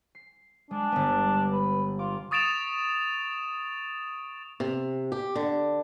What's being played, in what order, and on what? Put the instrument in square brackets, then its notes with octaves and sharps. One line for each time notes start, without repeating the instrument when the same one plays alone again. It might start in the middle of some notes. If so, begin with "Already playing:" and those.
[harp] C7
[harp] G#3 [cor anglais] D4
[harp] G1 B3
[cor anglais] B4
[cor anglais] F4 [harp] D6
[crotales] C#6 D#6 A6 D7 E7 F7
[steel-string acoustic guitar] C3
G4
D3